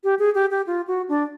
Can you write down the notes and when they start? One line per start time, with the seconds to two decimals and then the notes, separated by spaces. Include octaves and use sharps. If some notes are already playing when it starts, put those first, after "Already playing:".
0.04 G4
0.19 G#4
0.35 G4
0.51 G4
0.67 F4
0.87 F#4
1.09 D4